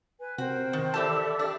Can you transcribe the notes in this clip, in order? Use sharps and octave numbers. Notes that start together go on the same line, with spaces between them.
B4 G#5
C3 F#4 A#4 C5 G5
D#3
E3 G4 A4 D5 E5 A5
D4 G4